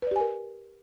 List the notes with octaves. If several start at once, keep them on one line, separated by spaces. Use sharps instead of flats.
G4 A#4 B4 D5 G#5